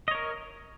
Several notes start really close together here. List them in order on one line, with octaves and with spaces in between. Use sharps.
D#5 C#5 A#4